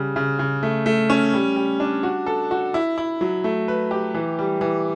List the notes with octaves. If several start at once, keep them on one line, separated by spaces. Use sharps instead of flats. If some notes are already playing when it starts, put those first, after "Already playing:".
Already playing: C#3 G3
C#3
C#3
A3
A3
C#4
G3
G3
D4
F#4
A4
F#4
E4
E4
F#3
A3
B4
G4
E3
G3
E3